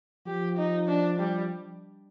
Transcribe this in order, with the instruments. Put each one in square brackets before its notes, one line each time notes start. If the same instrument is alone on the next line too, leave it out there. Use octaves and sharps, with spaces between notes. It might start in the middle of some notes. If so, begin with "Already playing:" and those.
[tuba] F3 [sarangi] G4
[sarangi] D#4
D4
G3